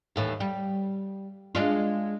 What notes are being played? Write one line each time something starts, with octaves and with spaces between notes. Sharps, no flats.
D#2 A2 E3
G3
G#3 D4 F4